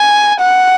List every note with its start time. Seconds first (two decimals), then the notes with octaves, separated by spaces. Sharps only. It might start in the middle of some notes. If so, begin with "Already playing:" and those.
Already playing: G#5
0.39 F#5